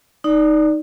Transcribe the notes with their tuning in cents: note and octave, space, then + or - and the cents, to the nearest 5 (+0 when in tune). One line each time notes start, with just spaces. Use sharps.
D#4 +0 D5 +0